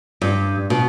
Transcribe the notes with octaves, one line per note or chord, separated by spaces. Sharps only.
G2
B2